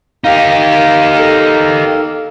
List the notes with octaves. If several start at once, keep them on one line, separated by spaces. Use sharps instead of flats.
A#3 D#4 G4 A#4 F5
A4